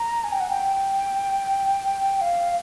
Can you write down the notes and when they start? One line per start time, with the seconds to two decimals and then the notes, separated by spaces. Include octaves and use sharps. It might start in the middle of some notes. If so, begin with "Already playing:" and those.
Already playing: A#5
0.24 G#5
0.32 G5
0.40 F#5
0.50 G5
2.21 F5